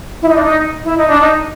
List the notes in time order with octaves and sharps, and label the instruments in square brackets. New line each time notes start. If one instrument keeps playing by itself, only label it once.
[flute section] E4
D#4
D4
D#4
E4
D#4
D4
D#4